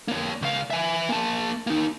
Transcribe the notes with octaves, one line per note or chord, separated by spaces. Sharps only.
A#3 C#5
C#2 F5
E5 G#5
A#3 A5
A#3 D#4